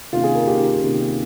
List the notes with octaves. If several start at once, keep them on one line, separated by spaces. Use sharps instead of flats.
C3 D#3 A#3 C#4 F4
G#4
A#4
C3 D#3 A#3 C#4 G4
C3 D#3 A#3 C#4